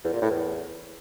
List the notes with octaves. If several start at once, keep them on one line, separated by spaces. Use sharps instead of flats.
E2
A#2
A2
E2